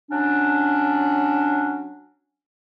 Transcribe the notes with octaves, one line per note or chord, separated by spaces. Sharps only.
F#3 C#4 D4